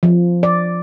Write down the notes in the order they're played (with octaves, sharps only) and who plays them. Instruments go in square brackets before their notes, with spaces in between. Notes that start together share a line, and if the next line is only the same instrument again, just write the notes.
[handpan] F3
D5